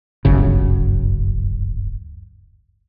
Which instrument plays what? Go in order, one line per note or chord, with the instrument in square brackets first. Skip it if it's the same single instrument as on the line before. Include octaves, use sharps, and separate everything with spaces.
[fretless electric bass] D1 G1 F#2 C#3